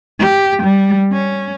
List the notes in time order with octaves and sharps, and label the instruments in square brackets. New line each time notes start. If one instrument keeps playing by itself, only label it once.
[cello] G4
G3
C#4